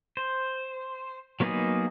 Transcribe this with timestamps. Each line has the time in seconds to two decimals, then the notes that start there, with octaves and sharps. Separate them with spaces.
0.17 C5
1.40 F#3 A#3 B3 D#4 G#4